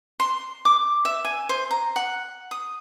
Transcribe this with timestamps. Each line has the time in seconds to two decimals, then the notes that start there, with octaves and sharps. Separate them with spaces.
0.20 C6
0.65 D6
1.05 E5
1.25 G#5
1.49 C5
1.71 A#5
1.96 F#5
2.51 D#6